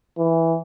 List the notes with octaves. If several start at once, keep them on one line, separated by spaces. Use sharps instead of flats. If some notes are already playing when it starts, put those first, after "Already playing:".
E3